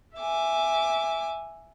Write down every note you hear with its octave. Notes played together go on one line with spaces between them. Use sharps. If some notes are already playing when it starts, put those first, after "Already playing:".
E5 G#5 D6